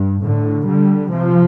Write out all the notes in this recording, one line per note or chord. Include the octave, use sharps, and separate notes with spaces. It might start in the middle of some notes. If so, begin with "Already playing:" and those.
Already playing: G2
A2 D3
D3 G3
C3 F3